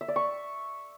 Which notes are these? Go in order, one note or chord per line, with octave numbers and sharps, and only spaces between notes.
E5
D5
C#6